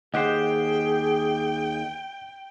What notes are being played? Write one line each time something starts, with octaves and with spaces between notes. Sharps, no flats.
D#2 G4 G#4 C5 D#5 F#5 G5 F#6